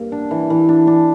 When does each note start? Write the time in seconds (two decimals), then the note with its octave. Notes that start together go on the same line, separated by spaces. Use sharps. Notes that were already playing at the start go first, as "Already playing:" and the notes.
Already playing: G2 A#3
0.12 D4
0.31 E3
0.50 E3
0.69 D4
0.87 D4